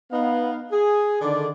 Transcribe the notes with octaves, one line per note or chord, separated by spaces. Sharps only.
B3 D#4 F5
G#4
D3 D#3 D5